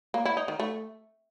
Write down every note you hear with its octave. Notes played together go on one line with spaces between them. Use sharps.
A#3
E4
D#4
D#3
A3